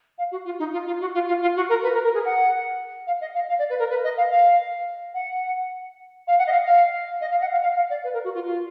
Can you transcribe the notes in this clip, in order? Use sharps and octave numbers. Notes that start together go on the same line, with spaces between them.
F5
F#4
F4
D#4
F4
F4
F#4
F4
F4
F4
F#4
A#4
B4
A#4
A#4
G#4
F#5
F5
D#5
F5
F5
D5
B4
A#4
B4
D#5
F5
F5
F#5
F5
F#5
D#5
F5
F5
D#5
F5
F#5
F5
F5
F5
D5
B4
A#4
F#4
F4
F4